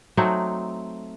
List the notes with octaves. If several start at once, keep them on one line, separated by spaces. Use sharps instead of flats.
F#3 A3 C4 D#4